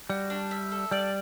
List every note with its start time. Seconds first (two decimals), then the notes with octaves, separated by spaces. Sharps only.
0.10 G3 F#4
0.30 D4
0.51 E5
0.72 A4
0.91 G3 D5